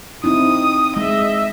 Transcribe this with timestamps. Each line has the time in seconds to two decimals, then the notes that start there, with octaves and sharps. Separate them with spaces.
0.24 C4 D#4 E4 D#6
0.97 G#3 D#5 E5